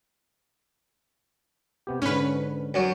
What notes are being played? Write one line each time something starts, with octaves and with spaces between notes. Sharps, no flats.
C3 B3 G4
G#2 D3 C#4 B4
F#2 F#3